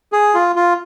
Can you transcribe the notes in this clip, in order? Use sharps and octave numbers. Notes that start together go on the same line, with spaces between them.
G#4
F4
F4